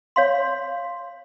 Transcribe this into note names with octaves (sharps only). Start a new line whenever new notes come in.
C#5 F5 C6